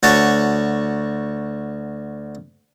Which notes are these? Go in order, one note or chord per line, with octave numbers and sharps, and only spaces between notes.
D2 F#4 C#5 A5 C#6